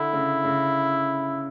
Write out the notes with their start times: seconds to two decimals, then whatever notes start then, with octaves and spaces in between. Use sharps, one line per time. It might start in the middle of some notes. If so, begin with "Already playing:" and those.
Already playing: D3 E4
0.13 C#3
0.44 C#3